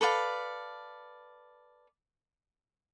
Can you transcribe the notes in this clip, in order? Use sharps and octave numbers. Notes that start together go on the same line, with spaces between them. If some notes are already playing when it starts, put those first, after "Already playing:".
A4 B4 D5 F5